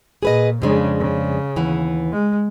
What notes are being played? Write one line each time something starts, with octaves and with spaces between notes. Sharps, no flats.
A#2 G#4 B4 D#5
F2 C#3 G#3 D4
C#3
D#2 E3 B3
G#3